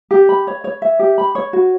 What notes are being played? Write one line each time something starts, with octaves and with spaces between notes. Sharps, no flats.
G4
B5
C#5
C#5
E5
G4
B5
C#5
F#4